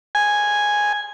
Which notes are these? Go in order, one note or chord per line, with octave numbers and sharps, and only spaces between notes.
G#5